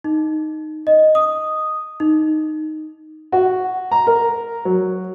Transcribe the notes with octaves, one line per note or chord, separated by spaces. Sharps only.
D#4
D#5
D#6
D#4
F#4
A#5
A#4
F#3